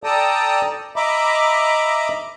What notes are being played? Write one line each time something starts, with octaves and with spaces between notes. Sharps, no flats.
A4 D5 G5 A5 A#5 D#6
D#5 E5 A#5 B5 D6